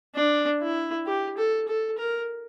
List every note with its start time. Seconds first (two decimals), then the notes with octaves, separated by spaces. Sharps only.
0.15 D4
0.62 E4
1.06 G4
1.38 A4
1.68 A4
1.98 A#4